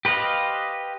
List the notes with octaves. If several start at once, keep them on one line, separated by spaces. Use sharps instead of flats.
G4 B4 C5 D#5 F5